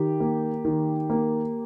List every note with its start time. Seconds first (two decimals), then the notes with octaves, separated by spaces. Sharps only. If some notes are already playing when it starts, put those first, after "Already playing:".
Already playing: D#3 G4
0.20 A#3
0.65 D#3
1.10 A#3